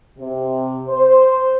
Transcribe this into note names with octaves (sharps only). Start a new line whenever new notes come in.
C3
C5